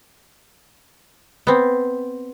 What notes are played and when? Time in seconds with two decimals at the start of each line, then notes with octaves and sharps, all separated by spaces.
1.47 B3 C4